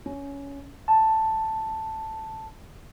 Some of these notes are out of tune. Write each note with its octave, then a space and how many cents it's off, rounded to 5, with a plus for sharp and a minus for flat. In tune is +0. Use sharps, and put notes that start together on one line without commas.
C#4 +15
A5 +5